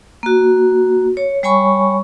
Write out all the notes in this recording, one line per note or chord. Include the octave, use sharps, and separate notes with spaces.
A#3 F#4
C#5
G3 C#5 G#5 B5 C#6